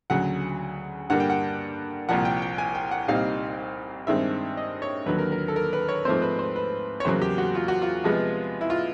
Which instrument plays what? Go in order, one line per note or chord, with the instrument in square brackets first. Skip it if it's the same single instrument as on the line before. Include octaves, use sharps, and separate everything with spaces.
[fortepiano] D2 C#3 F#3 F#5
G2 D3 G3 A#3 F#5
G5
F#5
C2 A#2 F3 F#5
G5
G5
G#5
G5
F#5
C2 A#2 G3 C4 D#4 F5
G2 D#3 G#3 C4 E5
D#5
C#5
D#2 D3 F#3 B4
A#4
A#4
A4
A#4
B4
C#5
G#2 F3 A3 C4 C5
B4
C5
B4
C#5
E2 C#3 F#3 A#3 C5
G4
F#4
F4
F#4
F4
C3 F3 G#3 B3
E4
F4